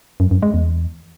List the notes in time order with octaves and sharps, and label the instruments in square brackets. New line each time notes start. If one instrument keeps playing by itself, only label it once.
[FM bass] F#2
F#2
G#3
E2